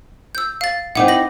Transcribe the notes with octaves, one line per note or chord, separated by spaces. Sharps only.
E6 G6
F5 A6
C4 D#4 E4 F#5 D6
A#6 F#7